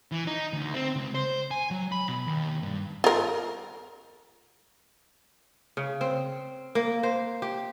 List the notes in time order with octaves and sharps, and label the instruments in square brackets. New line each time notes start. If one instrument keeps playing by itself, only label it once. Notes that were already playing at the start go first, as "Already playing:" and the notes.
[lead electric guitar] E3
D#4
D2
C4
C#2
C5
G#5
F#3
B5
B2
D#2
G2
[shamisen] F4 A#4
[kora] C#3
C4
A#3
C5
G4